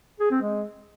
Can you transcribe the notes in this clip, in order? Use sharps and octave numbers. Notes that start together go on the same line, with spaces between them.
G#4
C4
G#3